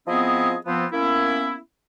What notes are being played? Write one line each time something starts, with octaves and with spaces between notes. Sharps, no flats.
F3 B3 C4 E4 G#4 D#5
F3 B3 C4
A#3 B3 C#4 E4